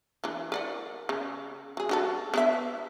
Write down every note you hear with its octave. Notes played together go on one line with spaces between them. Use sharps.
E3 D4
A#4 D5 F#5
C#3
F#3 G#4
D4 F#4 A4
B3 D4 E5